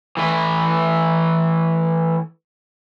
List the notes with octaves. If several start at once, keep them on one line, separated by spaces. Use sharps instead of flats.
E3 A3 B4